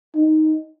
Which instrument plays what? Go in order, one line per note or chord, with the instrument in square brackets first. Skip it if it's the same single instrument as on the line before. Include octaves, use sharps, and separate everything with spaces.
[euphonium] D#4